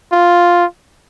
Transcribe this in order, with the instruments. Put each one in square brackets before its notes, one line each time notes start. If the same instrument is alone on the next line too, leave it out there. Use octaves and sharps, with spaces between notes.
[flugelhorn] F4